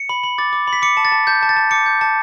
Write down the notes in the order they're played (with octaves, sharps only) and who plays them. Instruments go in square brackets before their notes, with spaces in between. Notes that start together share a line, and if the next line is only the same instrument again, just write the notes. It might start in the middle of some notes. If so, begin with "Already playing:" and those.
Already playing: [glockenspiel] C#7
B5
B5
D6 A6
D6
B5
B6
D6 C#7
A5
A6
A5
A5 G6
A5
A6
A5
D6 C#7
G6
A5